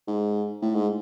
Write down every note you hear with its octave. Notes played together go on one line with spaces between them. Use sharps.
G#2
A2
G#2